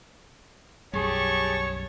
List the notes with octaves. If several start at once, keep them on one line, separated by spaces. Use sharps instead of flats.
B1 F#2 G3 G4 G#4 C#5 A5 C#6